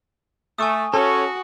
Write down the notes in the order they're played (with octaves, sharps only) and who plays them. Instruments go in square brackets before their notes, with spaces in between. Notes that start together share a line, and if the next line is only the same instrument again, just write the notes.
[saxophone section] A3 [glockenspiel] G#5 C#6 D#6
[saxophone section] C#4 [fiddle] F#4 [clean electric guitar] A4